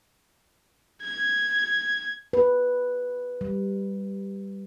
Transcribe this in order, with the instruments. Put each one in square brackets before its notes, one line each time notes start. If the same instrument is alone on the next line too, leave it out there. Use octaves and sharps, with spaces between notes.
[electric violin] G#6
[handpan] B4
G3